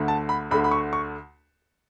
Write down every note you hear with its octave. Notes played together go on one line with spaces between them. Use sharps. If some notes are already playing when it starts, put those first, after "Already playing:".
Already playing: D2 D3 A3
A5
B5
D2 D3 A3 B5
B5
C#6
C#6